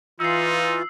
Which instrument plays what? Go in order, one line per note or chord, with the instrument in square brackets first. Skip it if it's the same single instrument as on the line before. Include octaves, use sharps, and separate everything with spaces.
[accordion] E3 F4 [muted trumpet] D#4 [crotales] E6 C7